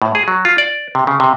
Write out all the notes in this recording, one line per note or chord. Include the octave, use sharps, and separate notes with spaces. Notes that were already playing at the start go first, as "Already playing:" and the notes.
A2
G#4
F#3
F4
D5
C3
C#3
C3